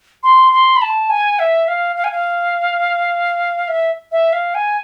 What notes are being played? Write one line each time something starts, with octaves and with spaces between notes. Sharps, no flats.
C6
C6
B5
A5
G#5
E5
F5
F5
G#5
F5
E5
E5
F5
G#5